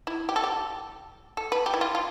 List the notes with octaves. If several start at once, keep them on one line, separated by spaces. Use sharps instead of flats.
E4
G4
A4
G4
A4
B4
G4
E4
F4
F4